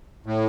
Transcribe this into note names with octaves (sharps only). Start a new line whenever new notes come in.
A2